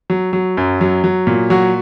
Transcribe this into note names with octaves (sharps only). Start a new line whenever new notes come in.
F#3
F#3
F#2
F#3
F#3
A#2
F#3 F#4